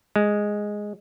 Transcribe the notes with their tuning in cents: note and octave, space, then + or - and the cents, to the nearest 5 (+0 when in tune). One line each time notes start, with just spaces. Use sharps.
G#3 +0